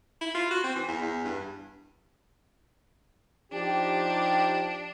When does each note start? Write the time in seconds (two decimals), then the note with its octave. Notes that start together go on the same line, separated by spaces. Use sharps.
0.21 E4
0.34 F4
0.51 F#4
0.64 C4
0.76 E3
0.88 E2
1.02 E2
1.24 G2
3.52 F3 D4 D#4 G4